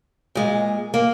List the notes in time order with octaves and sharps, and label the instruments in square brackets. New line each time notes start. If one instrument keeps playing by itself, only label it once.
[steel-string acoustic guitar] A#2 G#3
A#3